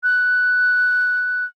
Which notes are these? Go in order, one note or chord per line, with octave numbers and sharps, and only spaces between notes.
F#6